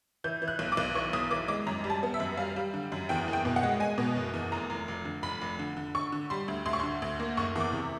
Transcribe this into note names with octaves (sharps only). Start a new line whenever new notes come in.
E3 G6
E3
F#6
B1
D6
B1
E3 C#6
B1 D#6
E3 D6
G#3 D6
F#2 A#5
G3
A5
B3
E5
F#2
G3 F5
G3
D3
F#2
E2 G5
F#1
G5
B2
F#5
G#3
G#3 G#5
B2
F#1
E2
F1 A#5
F1
F1
D3
F1 B5
F1
D3
D3
D3 C#6
D3
G3 C6
D2
D2 C6
C#6
D3 C6
D2
A#3
F#1 C#6
E2 D6
C3